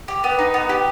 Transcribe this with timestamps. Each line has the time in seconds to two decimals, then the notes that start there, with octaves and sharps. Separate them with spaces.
0.08 G4
0.24 B3
0.39 D#4
0.54 B3
0.69 G4